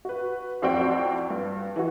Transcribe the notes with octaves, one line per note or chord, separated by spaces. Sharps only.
F#4 B4
A1 F2 C4 F#4 D5 G5
G2
E3 F#4